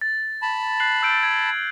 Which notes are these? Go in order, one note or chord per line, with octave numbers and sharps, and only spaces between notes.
A6
A5 B5
F#6 C7 F#7
E6 G6 D7
G#6